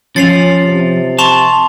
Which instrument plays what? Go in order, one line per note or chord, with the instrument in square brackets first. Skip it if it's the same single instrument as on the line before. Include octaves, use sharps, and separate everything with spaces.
[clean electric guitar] F3 [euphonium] C#4 [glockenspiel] A6 C7 F7
[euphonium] C3
[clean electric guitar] A5 [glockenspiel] C6 C#6 F7